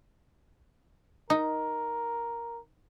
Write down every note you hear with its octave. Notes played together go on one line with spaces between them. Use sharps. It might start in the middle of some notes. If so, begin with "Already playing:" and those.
D#4 A#4